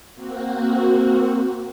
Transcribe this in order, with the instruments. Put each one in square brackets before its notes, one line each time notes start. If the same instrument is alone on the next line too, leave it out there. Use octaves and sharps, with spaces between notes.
[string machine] A#3 C4 F#4